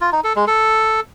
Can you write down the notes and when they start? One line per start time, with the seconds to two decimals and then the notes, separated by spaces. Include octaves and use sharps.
0.01 F4
0.12 D#4
0.24 A4
0.36 G#3
0.48 A4